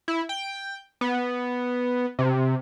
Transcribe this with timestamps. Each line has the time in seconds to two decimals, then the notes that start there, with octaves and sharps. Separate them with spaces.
0.08 E4
0.29 G5
1.01 B3
2.19 C3